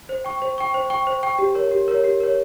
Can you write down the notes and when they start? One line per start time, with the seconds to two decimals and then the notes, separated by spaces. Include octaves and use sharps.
0.09 C5
0.24 G5 C#6
0.42 C5
0.58 G5 C#6
0.74 C5
0.90 G5 C#6
1.07 C5
1.23 G5 C#6
1.39 G4
1.55 A#4 C#5
1.71 G4
1.88 A#4 C#5
2.04 G4
2.20 A#4 C#5